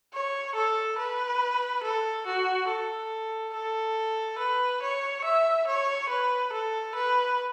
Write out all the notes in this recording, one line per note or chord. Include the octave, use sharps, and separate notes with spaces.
C#5
A4
B4
A4
F#4
A4
A4
B4
C#5
E5
C#5
B4
A4
B4